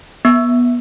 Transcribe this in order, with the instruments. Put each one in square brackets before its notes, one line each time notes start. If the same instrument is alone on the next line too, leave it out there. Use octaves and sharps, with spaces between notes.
[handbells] B3